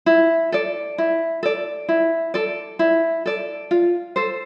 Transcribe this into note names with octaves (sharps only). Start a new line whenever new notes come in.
E4
A4 D5
E4
A4 D5
E4
A4 D5
E4
A4 D5
F4
A4 C5